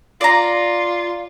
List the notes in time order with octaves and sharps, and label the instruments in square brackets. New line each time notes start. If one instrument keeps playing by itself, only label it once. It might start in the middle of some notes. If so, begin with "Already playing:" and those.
[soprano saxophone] F4 [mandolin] D5 A#5